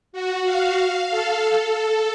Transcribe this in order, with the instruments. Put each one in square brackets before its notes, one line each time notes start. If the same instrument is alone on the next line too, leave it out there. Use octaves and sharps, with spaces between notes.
[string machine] F#4
F5
A4
A4